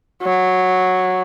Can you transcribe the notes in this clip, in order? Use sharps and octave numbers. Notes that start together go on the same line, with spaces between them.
F#3